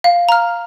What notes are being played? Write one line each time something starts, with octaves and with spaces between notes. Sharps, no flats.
F5
A#5 F6